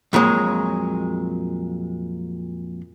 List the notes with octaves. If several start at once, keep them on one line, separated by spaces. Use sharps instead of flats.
F2 A#2 F#3 G#3